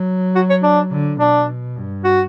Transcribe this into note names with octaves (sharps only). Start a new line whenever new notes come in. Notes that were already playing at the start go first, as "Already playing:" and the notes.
Already playing: F#3
F#4
C#5
D4
D3
B2 D4
G2
F#4